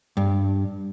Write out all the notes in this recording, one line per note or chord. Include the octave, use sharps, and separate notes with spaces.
G2